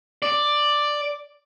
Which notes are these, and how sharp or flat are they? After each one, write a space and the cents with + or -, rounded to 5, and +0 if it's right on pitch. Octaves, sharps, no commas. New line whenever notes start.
D5 +5